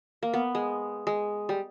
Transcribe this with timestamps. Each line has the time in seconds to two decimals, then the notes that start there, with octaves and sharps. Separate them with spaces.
0.23 A#3
0.34 B3
0.55 G#3
1.07 G#3
1.49 G3